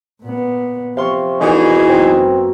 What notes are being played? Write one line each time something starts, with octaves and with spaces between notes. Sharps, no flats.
A#2 B3
C3 F3 F5 C6 C#6
C2 E3 B3 D#4 F#4 G#4
F#2 A#3 C4